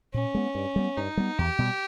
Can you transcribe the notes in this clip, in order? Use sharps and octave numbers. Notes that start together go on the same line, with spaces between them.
A#2 C#4
G#3 B3
G2
G3 B3
G2 D#4
G3 B3
E2 G4
B2 G3